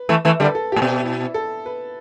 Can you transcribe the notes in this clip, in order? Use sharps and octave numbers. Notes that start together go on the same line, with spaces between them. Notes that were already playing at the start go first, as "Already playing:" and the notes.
Already playing: B4
E3 A3
E3 A3
D3 G3 A4
B4
A4
A2 G4
B2
E4
A4
B4